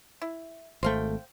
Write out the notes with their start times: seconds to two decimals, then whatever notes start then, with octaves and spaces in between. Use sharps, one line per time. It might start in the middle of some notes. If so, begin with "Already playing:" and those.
0.22 E4
0.83 G#1 A3 C5 F5 G5